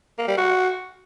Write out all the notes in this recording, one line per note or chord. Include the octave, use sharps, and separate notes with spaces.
A#3
G3
F#4